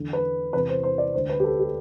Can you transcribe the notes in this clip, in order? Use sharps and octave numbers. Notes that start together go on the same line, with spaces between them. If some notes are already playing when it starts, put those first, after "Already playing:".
Already playing: E2 D3
B4
E2 C3 E3 B4
C5
C5
D5
D2 D3 C5
B4
G4
A4
G4